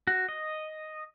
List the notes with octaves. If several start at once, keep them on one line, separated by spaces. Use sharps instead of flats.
F#4
D#5